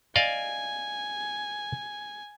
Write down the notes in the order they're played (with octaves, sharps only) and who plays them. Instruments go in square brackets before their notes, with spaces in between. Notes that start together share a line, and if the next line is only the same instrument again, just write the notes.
[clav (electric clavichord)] D5 D#5 F5 [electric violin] G#5